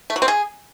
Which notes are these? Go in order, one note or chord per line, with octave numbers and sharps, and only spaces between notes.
A3
F#3
C4
G#4